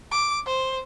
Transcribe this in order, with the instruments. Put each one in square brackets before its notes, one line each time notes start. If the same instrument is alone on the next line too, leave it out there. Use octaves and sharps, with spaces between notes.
[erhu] D6
C5